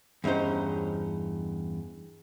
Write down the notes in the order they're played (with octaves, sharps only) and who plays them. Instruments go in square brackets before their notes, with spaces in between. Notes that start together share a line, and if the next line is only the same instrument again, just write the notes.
[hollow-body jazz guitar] E2 G2 C#4 D#4 C5